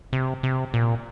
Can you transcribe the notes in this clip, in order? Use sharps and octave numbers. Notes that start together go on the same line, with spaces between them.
C3
C3
A#2